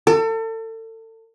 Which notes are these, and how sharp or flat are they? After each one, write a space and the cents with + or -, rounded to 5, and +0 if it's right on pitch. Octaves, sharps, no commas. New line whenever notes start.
A4 +35